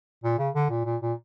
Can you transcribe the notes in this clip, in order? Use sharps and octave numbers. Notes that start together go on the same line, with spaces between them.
A#2
C#3
D3
A#2
A#2
A#2